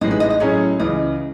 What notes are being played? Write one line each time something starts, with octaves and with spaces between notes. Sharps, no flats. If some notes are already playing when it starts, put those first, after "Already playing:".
A1 G#2 E3 G#3 D#5
B4
D#5
D#5
A2 F#3 C#4 G#4 C#5
C#2 C#3 E3 D#5